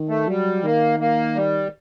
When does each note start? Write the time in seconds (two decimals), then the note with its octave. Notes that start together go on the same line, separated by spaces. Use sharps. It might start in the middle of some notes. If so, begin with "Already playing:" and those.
Already playing: D#3
0.09 A3
0.27 F#3 G3
0.63 D#3 A#3
1.00 A#3
1.36 G3